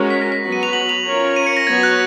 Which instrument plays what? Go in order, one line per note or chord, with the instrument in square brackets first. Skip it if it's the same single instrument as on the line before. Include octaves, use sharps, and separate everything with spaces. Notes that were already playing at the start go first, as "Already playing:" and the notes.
Already playing: [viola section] G#3 C#4 F#4 A#4
[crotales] B6
A#6
B6
[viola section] F#3 B3 F#4 B4
[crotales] D#7
F7
F#7
F7
[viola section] C#4 F4 A#4 C#5
[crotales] D#7
C#7
A#6
[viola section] F#3 B3 F#4 C#5 [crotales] G#6
[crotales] F#6